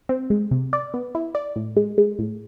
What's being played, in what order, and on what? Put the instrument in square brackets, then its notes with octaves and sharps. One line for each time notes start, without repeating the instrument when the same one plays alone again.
[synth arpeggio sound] C4
G#3
C3
D5
B3
E4
D5
A2
G#3
G#3
A2